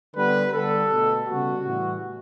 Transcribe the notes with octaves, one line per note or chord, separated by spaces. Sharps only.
D3 G3 B3 B4
D3 G3 B3 A4
B2 A3
C#3 G3 B3 F#4
A2 E3 G3